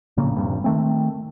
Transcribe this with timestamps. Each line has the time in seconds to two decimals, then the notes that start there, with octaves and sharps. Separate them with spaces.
0.17 A#1 A2 C#3 A#3
0.36 D#1 A#1 G2 C3
0.64 D#3 A3 C4